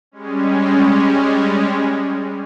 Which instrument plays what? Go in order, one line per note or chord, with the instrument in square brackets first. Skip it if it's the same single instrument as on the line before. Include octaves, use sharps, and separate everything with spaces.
[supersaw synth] G3 G#3 C#4